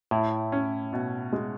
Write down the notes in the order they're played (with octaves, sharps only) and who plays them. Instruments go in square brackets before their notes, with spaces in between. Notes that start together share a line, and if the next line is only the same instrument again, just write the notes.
[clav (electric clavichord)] A2 [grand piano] E4
[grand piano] C#4
B2
G#3